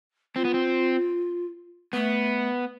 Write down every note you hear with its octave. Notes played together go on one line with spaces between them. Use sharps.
C4 F4
B3
C4
A3 B3